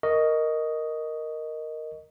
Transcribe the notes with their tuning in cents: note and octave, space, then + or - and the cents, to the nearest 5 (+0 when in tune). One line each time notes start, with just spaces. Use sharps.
A#4 +0 D#5 +0 C#6 +15